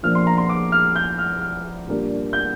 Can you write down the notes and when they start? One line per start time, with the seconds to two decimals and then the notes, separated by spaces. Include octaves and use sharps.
0.03 A#2 F3 A#3 D4 F6
0.15 C6
0.27 A#5
0.38 C6
0.49 D6
0.72 F6
0.96 G6
1.18 F6
1.41 F6
1.87 A#2 G3 A#3 D4
2.33 G6